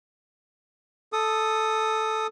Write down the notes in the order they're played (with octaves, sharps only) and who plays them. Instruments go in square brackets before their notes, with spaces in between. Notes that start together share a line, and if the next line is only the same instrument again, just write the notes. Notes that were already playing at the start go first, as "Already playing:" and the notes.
[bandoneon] A4 D#6